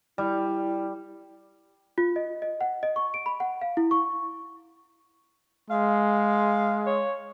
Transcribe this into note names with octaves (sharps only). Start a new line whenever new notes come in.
G3 E4
F4
D#5
D#5
F#5
D#5
C#6
D7
B5
F#5
F5
E4
C#6
G#3 F5
C#5